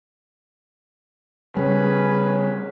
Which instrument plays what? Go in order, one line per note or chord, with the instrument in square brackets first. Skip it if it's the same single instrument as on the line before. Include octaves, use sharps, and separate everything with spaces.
[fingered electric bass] C#3 G3 [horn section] C#4 G#4 B4